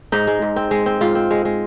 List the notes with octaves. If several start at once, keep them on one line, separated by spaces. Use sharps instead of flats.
G#2 D#4
G#3
G#2
C4
G#3
C4
G#2 F4
C4
G#3
G#3